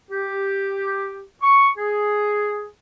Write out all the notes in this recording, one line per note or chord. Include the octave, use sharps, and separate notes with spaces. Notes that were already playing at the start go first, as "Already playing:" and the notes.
G4
C#6
G#4